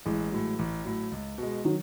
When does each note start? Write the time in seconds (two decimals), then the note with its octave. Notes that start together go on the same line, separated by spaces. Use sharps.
0.05 A1 E3 G#3
0.32 A2 F#3
0.59 A1
0.85 A2 F#3
1.12 C#2
1.38 B2 G#3
1.65 D#3 F#3